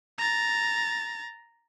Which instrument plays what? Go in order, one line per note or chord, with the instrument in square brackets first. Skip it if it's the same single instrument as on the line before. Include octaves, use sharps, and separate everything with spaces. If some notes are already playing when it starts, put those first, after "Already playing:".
[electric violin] A#5 A6